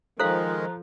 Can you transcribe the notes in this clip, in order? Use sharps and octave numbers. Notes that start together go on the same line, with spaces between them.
D#3 F3 G#3 A4 C5 F5 A#5 F#6